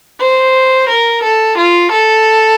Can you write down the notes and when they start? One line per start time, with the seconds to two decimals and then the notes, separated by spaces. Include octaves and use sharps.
0.20 C5
0.89 A#4
1.23 A4
1.58 F4
1.92 A4